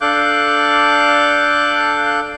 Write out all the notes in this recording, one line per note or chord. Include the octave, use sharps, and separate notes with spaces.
D4 A4 F5 D6 F#6 G6